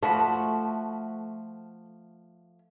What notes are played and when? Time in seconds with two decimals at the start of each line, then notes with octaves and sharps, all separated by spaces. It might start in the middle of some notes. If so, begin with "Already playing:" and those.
0.03 F3 A3 F#4 B5